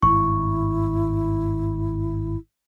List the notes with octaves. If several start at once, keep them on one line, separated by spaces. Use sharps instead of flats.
G#1 G2 E4 C#6